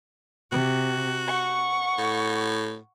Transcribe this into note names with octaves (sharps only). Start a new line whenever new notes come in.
C3 F#4
F#5 C#6
A2